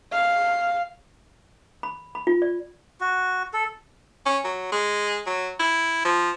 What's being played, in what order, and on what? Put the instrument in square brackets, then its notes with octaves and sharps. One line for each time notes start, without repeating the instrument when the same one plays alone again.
[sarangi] F5
[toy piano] B5
B5
F4
D5
[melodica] F#4
A4
[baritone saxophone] C#4
F#3
G#3
F#3
E4
F3